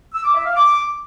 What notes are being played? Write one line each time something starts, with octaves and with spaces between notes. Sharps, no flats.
E6
D6
E5
F5
D6